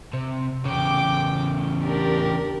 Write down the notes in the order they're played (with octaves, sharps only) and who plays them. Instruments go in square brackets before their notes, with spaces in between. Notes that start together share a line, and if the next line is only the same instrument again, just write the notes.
[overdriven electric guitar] C3
[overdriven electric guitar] E2 C#3 [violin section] G5 D6
[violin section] D4 G4 A#4